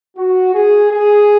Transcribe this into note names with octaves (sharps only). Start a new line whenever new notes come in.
F#4
G#4
G#4